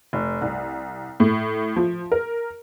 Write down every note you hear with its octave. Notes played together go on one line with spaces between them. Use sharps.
F1
C2
A2
F3
A#4